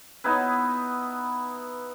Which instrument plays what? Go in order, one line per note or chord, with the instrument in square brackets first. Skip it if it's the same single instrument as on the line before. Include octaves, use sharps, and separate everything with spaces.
[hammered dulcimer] B3 D#4 E4 B4